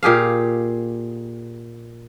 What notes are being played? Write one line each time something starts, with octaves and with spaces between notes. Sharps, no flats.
A#2 G4 G#4 F5